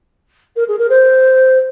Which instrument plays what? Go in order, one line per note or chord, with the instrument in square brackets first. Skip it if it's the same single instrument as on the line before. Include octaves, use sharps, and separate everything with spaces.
[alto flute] A#4
G#4
A#4
C5